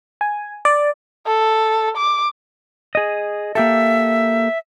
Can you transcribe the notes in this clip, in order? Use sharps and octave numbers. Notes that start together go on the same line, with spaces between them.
G#5
D5
A4
D6
G#4 D#5
A#3 G4 A4 E5